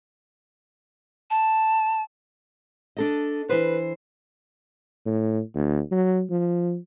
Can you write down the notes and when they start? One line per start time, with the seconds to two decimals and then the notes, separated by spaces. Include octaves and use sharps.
1.30 A5
2.97 D4 A4 D#5
3.49 E3 B4 C5
5.06 A2
5.55 D2
5.91 F#3
6.30 F3